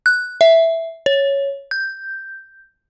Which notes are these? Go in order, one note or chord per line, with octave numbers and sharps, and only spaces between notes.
F#6
E5
C#5
G6